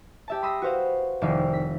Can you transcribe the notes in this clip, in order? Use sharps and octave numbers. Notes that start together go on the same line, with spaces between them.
G4 E5 A5
B5 C6 D#6 E6 A#6 B6
F#4 B4 C5 F5
F1 C2 D#3 E5 F5 C7
B6